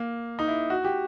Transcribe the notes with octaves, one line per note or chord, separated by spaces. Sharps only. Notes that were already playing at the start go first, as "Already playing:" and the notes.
Already playing: A#3
D#4
E4
F#4
G4